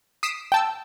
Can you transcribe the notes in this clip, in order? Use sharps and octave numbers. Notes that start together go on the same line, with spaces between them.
D#6 B6 C7 D7 E7
G5 A5 E6